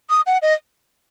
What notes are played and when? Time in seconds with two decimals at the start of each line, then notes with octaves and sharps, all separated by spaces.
0.10 D#6
0.27 F#5
0.42 D#5